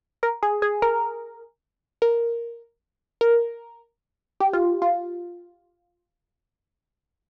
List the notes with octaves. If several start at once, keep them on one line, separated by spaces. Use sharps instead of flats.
A#4
G#4
G#4
A#4
A#4
A#4
G4
F4
F4